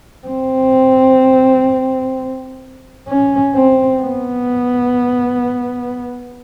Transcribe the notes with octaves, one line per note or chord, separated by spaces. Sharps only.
C4
C#4
C4
B3